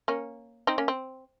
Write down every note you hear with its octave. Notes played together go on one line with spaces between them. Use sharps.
A#3 C#4
C4 D#4
A#3 C#4
C4